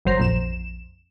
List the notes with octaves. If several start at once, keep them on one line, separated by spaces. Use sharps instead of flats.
G1 F#3 C5 A#5 C7
A#1 F2 E7